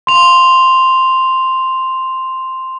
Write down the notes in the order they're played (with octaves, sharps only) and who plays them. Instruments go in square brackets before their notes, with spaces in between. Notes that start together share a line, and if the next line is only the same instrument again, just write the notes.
[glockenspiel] C6 F7